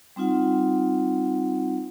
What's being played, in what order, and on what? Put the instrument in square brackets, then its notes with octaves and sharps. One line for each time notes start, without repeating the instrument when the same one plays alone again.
[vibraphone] G3 C4 D#4 F4 F#5